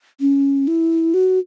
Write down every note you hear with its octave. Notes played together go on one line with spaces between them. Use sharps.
C#4
E4
F#4